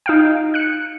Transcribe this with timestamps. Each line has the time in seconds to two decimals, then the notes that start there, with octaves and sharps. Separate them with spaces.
0.06 D#4 F5 G5
0.54 F#6 C#7